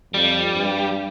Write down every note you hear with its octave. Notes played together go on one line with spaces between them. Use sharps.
F2 G3
G2